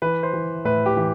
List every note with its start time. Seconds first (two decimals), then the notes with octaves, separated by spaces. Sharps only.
0.02 E3 B4
0.23 C5
0.33 E3
0.65 A2 B4
0.86 G4
0.97 E3